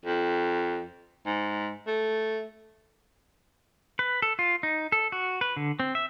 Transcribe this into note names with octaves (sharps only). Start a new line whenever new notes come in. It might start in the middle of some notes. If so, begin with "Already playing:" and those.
F2
G#2
A3
B4
A4
F4
D#4
A4
F#4
B4
D3
C4
E5